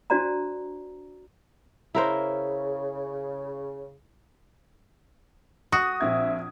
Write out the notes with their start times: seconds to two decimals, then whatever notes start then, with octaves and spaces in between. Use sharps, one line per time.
0.10 D4 F#4 C5 D5 A5 A#5
1.95 C#3 E4 A#4 C5
5.72 F#4 D#6
6.01 A#1 C4 E5 G#6